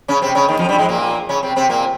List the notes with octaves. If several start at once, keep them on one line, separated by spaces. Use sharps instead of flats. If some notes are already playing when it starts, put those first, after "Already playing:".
C#3 C#4
C3 C4
C#3 C#4
D#2 D#3
F2 F3
G2 G3
G#2 G#3
A#2 A#3
C#3 C#4
C3 C4
C3 C4
A#2 A#3